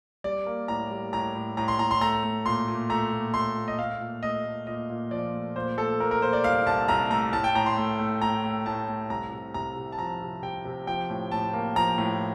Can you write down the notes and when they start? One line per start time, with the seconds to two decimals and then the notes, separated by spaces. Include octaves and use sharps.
0.24 G3 D5
0.46 A#3
0.68 A2 A#5
0.91 G3
1.13 A2 A#5
1.35 A2
1.57 A2 A#5
1.68 C6
1.79 A2 A#5
1.91 C6
2.01 A3 A#5
2.23 A3
2.45 A#2 C6
2.68 A#2
2.90 A3 A#5
3.12 A#2
3.34 A3 C6
3.56 A#2
3.68 D#5
3.78 A3 F5
4.01 A#2
4.23 A3 D#5
4.45 A3
4.67 A#2 D#5
4.90 A#2
5.11 F3 D5
5.34 A3
5.56 A#2 C5
5.78 A3 A4
6.00 A#2 A#4
6.11 A#4
6.22 A#2 C5
6.33 D5
6.44 C2 F5
6.66 C2 A5
6.88 C2 A#5
7.10 A3 A#5
7.33 A2 A5
7.44 G5
7.55 A2 A#5
7.66 C6
7.77 A3
7.99 A3
8.21 A2 A#5
8.44 A3
8.66 A2 A5
8.88 A3
9.10 C2 A#5
9.32 C3
9.54 C2 A#5
9.77 C3
9.92 A5
9.98 F3 A#5
10.21 C3
10.43 C3 G5
10.65 C3
10.87 F3 G5
11.10 A2
11.32 A2 A5
11.53 A#3
11.76 F3 A#5
11.98 A2